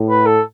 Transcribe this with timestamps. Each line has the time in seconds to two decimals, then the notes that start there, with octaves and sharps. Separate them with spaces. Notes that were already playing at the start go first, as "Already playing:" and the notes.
Already playing: A2
0.09 B4
0.26 A4